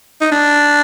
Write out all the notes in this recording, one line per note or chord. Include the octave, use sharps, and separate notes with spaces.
D#4
D4